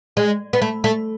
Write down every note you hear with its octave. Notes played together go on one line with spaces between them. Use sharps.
G#3
B3
A3
A3